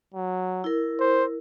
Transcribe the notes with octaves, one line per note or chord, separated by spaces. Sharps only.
F#3
E4 A#4
C5